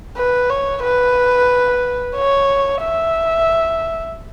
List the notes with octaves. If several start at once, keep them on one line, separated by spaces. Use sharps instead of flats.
B4
C#5
B4
C#5
E5